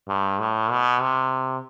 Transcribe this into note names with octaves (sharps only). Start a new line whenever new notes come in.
G2
A2
B2
C3